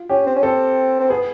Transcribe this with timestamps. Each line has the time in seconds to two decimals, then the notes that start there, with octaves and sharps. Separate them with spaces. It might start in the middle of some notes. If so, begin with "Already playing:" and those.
Already playing: F4
0.09 C#4 G4
0.26 C4
0.36 C#4
0.43 C4 A4
1.00 C4
1.10 B3 G#4